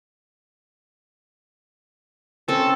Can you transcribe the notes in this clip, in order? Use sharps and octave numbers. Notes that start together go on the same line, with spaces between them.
C4 C#4 A4